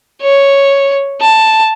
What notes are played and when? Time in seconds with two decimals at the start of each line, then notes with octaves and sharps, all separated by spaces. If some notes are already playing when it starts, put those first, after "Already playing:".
0.22 C#5
1.21 A5